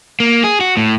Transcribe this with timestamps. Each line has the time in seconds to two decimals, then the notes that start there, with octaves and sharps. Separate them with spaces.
0.20 A#3
0.44 G#4
0.61 F#4
0.77 A2